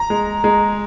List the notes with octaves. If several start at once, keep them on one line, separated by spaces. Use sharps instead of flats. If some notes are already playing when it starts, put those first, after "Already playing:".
Already playing: A#5
G#3
G#3